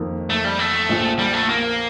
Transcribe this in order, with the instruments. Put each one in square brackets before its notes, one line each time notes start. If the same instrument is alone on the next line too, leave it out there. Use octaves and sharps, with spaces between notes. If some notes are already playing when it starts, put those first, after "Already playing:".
Already playing: [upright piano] F2 D#3 A#3
[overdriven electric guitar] A3
G3
A3
[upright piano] A#1 A#2 F3
[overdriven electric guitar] G3
A3
A#3